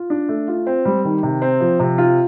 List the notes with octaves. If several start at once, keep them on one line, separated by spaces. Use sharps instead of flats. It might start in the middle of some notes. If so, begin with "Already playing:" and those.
Already playing: F4
D4
A3
F4
C4
G3
D#3
C3
C4
F3
C3
F4